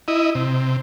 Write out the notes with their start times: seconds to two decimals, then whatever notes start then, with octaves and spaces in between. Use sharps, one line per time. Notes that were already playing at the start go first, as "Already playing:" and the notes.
0.08 E4 D#5
0.35 C3